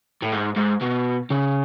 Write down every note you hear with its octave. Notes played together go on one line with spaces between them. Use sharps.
A2
G#2
G#2
B2
C#3